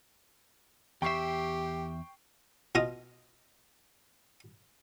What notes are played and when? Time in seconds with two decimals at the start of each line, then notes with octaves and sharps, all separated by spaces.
1.02 E2 G4 E5 G5 C#6 C7
2.75 B2 F4 D#5 D#6